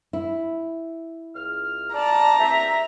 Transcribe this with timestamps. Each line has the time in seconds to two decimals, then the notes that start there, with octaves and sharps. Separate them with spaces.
0.13 E4
1.35 C#2 F6
1.94 D5 A5 A#5
2.39 E2 C4 E5